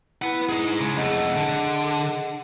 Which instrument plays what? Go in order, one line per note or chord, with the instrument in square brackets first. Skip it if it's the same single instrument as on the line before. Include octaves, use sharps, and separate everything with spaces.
[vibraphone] E4 [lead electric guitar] B4 F#5
[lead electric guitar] D#4 G#4
C#3 G#3
[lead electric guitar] F2 A3 [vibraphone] G#4 D#5 F#5
[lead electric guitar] D3